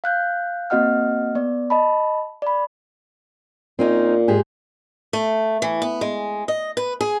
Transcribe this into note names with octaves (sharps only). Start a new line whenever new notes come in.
F5 F#6 G6
A#3 C4 F#4 D#5 F#5 F6
B3 D5
D#5 A5 B5
D5 B5
A#2 C4 C#4 D#4
G#2 G4 G#4
A3
E3
B3
G#3
D#5
B4
G#4